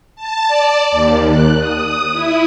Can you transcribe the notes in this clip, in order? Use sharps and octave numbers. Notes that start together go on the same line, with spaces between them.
A5
D5
D#2
F#6
D#6
E4